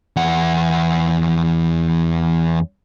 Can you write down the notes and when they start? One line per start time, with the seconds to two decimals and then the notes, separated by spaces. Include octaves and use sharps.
0.16 E2 F#5